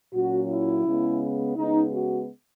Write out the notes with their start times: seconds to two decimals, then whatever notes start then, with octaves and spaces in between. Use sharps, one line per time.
0.14 A#2 F#3 C#4 F#4
0.49 E4
0.85 C#3 G#3 B3
1.57 C#3 G#3 B3 D#4
1.93 F#4